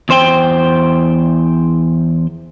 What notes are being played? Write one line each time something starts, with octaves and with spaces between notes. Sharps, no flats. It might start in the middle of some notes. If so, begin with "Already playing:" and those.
E2 C5 G5